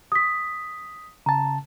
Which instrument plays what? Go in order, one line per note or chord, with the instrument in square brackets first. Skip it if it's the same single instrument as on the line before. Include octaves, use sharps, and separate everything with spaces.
[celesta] D#6 B6
[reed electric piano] C#3 A5 [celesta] A#5